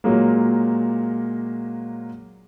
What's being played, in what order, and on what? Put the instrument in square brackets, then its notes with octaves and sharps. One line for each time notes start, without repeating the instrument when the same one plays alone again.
[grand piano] A#2 F#3 G#3 A#3